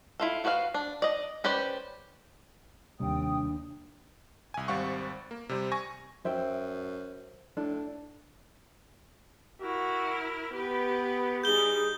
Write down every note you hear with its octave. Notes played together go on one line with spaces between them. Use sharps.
E4 F4 A4
F4 F#4 B4 D5 F5
D4
D5 D#5
C#4 G4 B4 C5 D5
D#2 C3 G3 D4 G5 D#6
C2 G#5
G#1 G3 C4 F5 F#5 C#6
A#3
C3 G3 C4
G#5 C#6 A#6
F#2 C5 E5 G5
A2 D4
E4 F#4 A#4
B3 G4 B4
G3 D#4 G#4 G6 G7